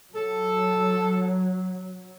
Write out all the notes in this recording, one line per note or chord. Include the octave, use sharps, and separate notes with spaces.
F#3 A4